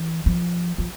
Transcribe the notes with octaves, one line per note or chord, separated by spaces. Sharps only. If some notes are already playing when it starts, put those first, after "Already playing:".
Already playing: E3
F3
F3